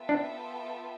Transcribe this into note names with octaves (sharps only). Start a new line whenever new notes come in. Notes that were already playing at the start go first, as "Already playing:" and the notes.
Already playing: B3 F4 A4 E5 G5
D4